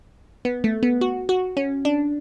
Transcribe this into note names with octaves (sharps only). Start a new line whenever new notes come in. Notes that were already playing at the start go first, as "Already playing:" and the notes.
B3
A3
B3
F#4
F#4
C#4
D4